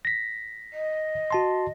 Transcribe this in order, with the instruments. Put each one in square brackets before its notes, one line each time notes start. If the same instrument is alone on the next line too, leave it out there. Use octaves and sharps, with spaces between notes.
[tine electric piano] A#6 B6
[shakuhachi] D#5
[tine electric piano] F#4 A5 C6